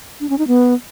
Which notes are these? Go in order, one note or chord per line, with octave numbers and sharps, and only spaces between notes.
D4
C#4
D#4
B3